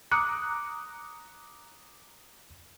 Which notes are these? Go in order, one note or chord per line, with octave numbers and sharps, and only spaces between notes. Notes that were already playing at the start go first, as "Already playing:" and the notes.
A#5 D6 D#6 F#6 C#7